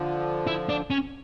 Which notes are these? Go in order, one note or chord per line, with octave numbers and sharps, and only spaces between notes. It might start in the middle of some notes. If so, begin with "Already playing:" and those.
Already playing: D3 F3
E4
D4
C#4